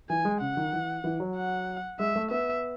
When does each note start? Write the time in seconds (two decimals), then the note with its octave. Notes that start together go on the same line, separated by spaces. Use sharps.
0.09 E3 G#5
0.25 G#3
0.40 C#3 F#5
0.57 D#3
0.73 E3
1.04 E3
1.20 F#3
1.36 F#5
1.99 G#3 E5
2.16 A3
2.31 B3 E5